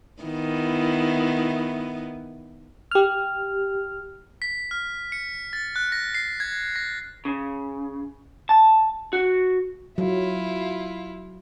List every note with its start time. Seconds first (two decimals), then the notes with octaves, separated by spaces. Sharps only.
0.23 D#3 B3 E4
2.91 G4 F6
4.42 B6
4.71 F6
5.12 C#7
5.53 A6
5.76 F#6
5.92 A#6
6.15 C7
6.40 G#6
6.76 A#6
7.25 C#3
8.49 A5
9.13 F#4
9.98 F#3 E4 F4